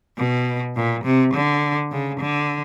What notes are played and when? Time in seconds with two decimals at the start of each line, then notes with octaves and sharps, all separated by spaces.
0.18 B2
0.76 A#2
1.04 C3
1.34 D3
1.91 C#3
2.20 D3